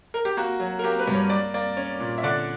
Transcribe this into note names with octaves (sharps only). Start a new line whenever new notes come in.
A#4
G4
A#3 F#4
F#3
A#4
A#3 G4
B4
G2
C#5
A#3 D5
A#3 D5
C#4
A#2
E5
D3 D5